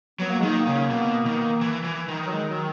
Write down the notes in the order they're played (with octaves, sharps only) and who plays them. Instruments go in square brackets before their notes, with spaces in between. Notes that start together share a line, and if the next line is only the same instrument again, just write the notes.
[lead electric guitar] F#3 [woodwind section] B3
[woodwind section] A#3
G#3
[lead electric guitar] D#3 [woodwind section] A#3
[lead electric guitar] C#3
B2
D#3
E3
E3
D#3
[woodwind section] F#3
G#3
F#3